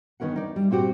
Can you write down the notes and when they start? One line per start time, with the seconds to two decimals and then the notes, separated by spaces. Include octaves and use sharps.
0.20 D#3 B3 C#4 A#4 F#5
0.36 D#4 D5
0.56 G3
0.71 A#2 C4 F#4 G4